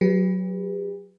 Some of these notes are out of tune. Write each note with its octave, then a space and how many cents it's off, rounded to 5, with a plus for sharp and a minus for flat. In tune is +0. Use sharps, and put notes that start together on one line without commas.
F#3 +0 G4 +45 B4 +0